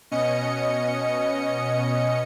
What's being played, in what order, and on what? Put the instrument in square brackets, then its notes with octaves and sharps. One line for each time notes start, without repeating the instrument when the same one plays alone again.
[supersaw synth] B2 C#4 D#5 C#7